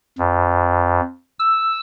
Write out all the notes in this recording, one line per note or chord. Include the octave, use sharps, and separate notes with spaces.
F2
E6